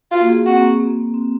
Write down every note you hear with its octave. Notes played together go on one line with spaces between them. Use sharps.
F4 F#4
A#3
G#4
C4 F#4
A#3
C4
A#3
C4